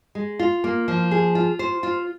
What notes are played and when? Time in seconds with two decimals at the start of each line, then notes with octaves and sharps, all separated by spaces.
0.15 G#3
0.39 F4
0.64 A#3
0.88 F3
1.11 G#4
1.35 F4
1.59 C5
1.83 F4